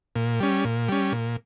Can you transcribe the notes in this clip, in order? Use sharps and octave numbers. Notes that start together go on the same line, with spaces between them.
A#2
G3 C#4
A#2
G3 C#4
A#2